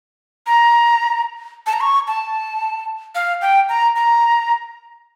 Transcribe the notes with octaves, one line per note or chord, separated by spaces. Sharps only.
A#5
A5
A#5
C#6
A5
F5
G5
A#5
A#5